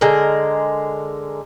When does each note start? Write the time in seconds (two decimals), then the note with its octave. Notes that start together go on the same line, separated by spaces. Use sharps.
0.01 D3 G#3 A#4